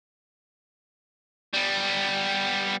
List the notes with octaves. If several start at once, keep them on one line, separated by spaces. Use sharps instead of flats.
G3 B3